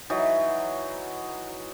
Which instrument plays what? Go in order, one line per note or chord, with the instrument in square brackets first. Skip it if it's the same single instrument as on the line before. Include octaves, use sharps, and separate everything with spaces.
[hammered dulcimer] E3 F#3 D#4